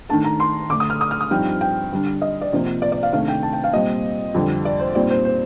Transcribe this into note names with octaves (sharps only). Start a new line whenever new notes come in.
D#3 A3 D4 A5
A#5
C6
D3 A3 D4 D6
D#6
F6
D#6
F6
D#6
G2 F3 C4 D#4 G5
G5
D3 G3 D4
D#5
D5
C3 F3 A#3
D5
D5
F5
C3 D#3 A3 D4 F5
G5
A5
G5
F5
A#2 G3 C4 D#5
F2 D3 G3
D5
C5
A#2 G3 C4 D#4 D5
C5
C5